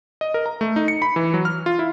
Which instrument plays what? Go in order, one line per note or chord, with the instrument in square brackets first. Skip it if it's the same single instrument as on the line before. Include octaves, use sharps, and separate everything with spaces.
[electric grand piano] D#5
A#4
A#5
A3
D#4
C#7
B5
E3
F#3
F6
F4
E4